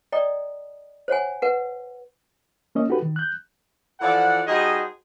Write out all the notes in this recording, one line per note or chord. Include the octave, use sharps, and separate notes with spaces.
D5 D#5 G5 A#5 D#6
C5 C#5 F#5 G#5
B4 F#5
A#3 C#4 D#5
D#4 F#4 G4 A4 B4
D#3
F#6 G6
E3 F3 A4 D5 F#5
G3 D#4 F#4 G#4 C5 D#5